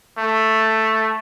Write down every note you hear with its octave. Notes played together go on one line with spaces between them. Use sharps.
A3